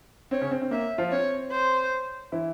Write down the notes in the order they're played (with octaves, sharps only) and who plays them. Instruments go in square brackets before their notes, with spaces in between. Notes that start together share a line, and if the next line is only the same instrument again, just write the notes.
[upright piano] C4 [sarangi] C#5
[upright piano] C#3 C#4
C4
C4
[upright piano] A#3 [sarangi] E5
[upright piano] F3 F4
[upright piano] C4 [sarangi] C#5
[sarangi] C5
[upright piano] E3 E4